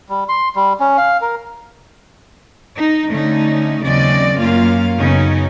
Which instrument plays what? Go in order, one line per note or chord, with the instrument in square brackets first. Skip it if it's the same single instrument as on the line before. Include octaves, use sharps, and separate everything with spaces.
[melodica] G3
C6
G3
C#4
F5
A#4
[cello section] D#4
D3 A3 C#4 D#4
D#2 C#3 F#3 C4 D5 D#5
F#2 A#3 C#4 F4 F5
F#2 C#3 F#3 B3 C#4 D#4